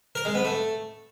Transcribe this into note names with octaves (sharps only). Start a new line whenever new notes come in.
A#4
G#3
B3
A3